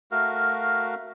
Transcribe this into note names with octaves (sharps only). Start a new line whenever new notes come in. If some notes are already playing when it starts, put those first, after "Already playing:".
A3 F#4 A#4 F5